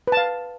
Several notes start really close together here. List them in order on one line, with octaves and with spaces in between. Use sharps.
B4 A5 F5